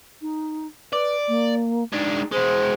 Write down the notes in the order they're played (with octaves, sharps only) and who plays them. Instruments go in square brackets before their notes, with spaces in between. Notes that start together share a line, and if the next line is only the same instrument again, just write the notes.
[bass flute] D#4
[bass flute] B4 [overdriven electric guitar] D5
[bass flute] A#3
[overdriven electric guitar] G#3 D4 [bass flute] D#4
[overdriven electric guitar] E2 G#3 [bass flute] C5